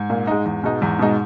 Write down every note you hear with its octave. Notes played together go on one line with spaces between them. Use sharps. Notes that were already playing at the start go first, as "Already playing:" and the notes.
Already playing: G#2
A#2
G#3 D#4
E2
B2 G#3 D#4
E2 G#2
B2 G#3 D#4